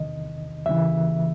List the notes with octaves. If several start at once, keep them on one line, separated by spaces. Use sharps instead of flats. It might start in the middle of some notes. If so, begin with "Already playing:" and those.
Already playing: E2 C3 D#3 D#5
D#2 C#3 E3 E5